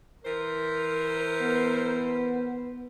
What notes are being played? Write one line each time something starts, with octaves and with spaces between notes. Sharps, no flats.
E3 A#4 C5
B3